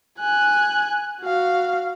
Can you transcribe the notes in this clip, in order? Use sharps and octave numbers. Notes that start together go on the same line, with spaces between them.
G#5 F#6
F#4 F5